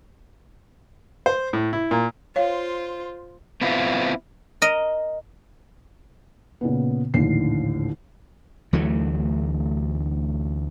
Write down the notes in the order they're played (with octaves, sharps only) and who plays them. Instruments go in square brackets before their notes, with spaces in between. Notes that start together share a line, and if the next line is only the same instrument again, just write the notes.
[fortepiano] C5
A2
E4
A#2
[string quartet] F4 C5 [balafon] C#5 F5
[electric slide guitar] B3 C4 E4 F4
[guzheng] A#4 D#5
[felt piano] A#2 C#3 B3
A#1 D#2 A2 D3 C7
[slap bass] D2 E3 F#3 A3